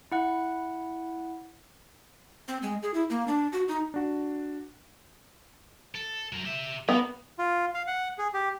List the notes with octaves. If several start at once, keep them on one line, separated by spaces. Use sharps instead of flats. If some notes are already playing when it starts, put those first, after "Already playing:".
E4 F#5 F#6
C4
G#3
G#4
E4
A#3
D4
F#4
D#4
D4 F#4
A4
F#3 A#4
G4 E5
B3 A#4 F5
F4
F5
F#5
G#4
G4